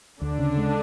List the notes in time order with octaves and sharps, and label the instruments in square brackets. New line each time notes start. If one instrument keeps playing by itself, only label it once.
[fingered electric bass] D2 [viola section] D3 D4
[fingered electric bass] C#3
G#3